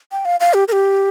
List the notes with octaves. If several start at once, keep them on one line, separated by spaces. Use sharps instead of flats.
G5
F5
F5
G4
A#4
G4